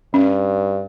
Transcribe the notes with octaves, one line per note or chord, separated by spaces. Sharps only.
G2 C#4